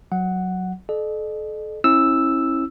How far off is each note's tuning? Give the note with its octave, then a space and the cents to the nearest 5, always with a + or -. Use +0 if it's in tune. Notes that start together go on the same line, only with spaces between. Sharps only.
F#3 +0 F#5 +0
A4 -35 D#5 -45
C#4 -45 E4 -15 E6 +0